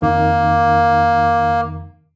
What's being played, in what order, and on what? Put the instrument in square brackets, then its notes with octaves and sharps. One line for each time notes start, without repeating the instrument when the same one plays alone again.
[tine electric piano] F2 D#3 [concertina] A#3